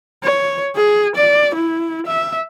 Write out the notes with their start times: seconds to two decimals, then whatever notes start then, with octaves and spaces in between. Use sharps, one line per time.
0.24 C#5
0.76 G#4
1.16 D5
1.55 E4
2.07 E5